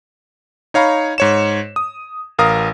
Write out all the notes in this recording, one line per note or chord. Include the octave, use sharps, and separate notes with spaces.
D#4 C#5 F5 A#5 B5 C#6
G#2 C#5 E7
D#6
A1 A#4 F5 A#5 D#6